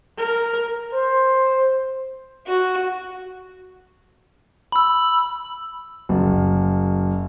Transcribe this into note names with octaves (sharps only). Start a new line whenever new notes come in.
A#4
C5
F#4
B5 E6
F#1